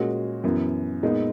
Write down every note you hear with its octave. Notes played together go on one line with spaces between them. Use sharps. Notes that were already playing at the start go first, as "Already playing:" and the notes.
Already playing: A#2 G#3 C#4 F#4
F#2 E3 B3
A#2 G#3 B3 D#4